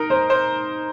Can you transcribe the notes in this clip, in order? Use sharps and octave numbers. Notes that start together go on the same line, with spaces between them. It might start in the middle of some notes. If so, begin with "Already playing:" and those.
Already playing: D#4 A#4
C5
C5